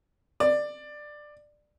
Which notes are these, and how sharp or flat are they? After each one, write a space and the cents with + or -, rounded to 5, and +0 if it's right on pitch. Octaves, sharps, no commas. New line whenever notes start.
D5 +15